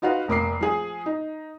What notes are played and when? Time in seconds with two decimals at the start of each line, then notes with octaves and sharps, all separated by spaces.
0.02 D#4 F4 F#4 B4 F5
0.28 F1 A#3 D6 C7
0.61 F3 G#4
1.06 D#4